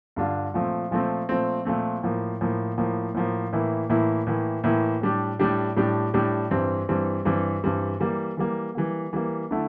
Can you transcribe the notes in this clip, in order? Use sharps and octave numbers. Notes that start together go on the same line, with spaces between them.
G2 D3 G3 D4 F4
A#2 F3 A3 C4
A#2 F3 A3 C4
A#2 F3 A3 C4
A#2 F3 A3 C4
A2 F3 A#3
A2 F3 A#3
A2 F3 A#3
A2 F3 A#3
A2 E3 A#3 E4
A2 E3 A#3 E4
A2 E3 A#3 E4
A2 E3 A#3 E4
A2 G3 D4 G4
A2 G3 D4 G4
A2 G3 D4 G4
A2 G3 D4 G4
G2 E3 G3 C4
G2 E3 G3 C4
G2 E3 G3 C4
G2 E3 G3 C4
E3 G3 A#3
E3 G3 A#3
E3 G3 A#3
E3 G3 A#3
D3 A3 E4